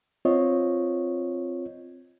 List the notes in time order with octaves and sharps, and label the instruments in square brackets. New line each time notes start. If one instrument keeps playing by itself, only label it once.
[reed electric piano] C4 F4 C#5 D#5